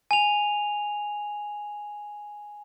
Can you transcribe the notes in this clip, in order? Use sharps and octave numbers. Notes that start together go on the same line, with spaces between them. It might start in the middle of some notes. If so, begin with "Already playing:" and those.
G#5 F7